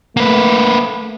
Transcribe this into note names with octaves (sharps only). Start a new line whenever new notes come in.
A3 A#3 B4